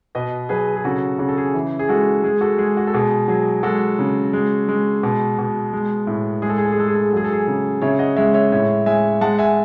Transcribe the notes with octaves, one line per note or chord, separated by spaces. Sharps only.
B2 B4 D#5
F#3 G#4 B4
G#4
C#3 F#4 A4
C#3 F#4
A4
G#4
E3
G#4
G#3 F#4 A4
G#3 G#4
F#4 A4
G#3 G#4
F#4
A4
B2 G#4
F#3 G#4
G#3 F#4 A4
C#3
G#3
G#3
B2
B2
G#3
A2
G#3 G#4
A4
G#4
A4
G#4
G#3 A4
G#4
A4
G#4
A4
F#3 G#4
A4
G#4
C#3
C#3 C#5 E5
D#5 F#5
G#3 C#5 E5
C#5 E5
A2 C#5 E5
G#3 E5 G#5
G#3 F#5 A5
E5 G#5